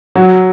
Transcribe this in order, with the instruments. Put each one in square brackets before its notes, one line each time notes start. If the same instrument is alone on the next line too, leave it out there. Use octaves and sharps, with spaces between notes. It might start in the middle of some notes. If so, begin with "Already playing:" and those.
[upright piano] F#3